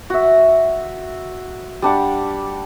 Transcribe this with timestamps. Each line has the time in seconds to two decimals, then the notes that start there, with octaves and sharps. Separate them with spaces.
0.10 F#4 E5
1.82 G3 D4 F#5